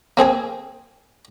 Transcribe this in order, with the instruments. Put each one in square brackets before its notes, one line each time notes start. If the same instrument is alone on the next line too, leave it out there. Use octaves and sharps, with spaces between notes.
[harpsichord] A#3 C4 G#4 G#5